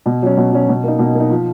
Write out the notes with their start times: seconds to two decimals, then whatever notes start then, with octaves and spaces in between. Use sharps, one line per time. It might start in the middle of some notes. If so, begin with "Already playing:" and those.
0.06 B2
0.22 F#3 C#4
0.37 B2
0.52 F#3 C#4
0.69 B2
0.84 A#3 D#4
0.99 B2
1.15 A#3 D#4
1.30 F3